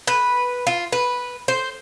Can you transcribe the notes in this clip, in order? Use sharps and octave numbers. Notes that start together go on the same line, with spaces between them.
B4
F4
B4
C5